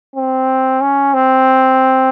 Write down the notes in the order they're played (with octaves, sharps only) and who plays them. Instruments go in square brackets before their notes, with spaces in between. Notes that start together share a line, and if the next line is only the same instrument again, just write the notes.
[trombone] C4
C#4
C4